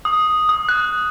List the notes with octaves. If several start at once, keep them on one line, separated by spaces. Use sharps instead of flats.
D#6
D#6
F#6